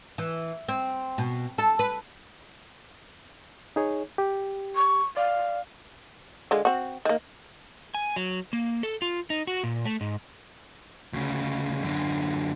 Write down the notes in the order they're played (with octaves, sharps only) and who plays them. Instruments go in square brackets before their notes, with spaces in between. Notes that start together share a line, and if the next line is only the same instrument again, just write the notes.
[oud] E3
C4
B2
A4
B4
[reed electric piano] D#4 G#4 C#5
G4
[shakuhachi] C#6
[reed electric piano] D5 [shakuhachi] F5
[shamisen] D3 G#3 F4
C4 F#4
D#3 A#3
[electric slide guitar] G#5
F#3
A#3
A4
F4
D#4
F#4
A#2
A3
G#2
[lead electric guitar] D2 C#3
F#2 D3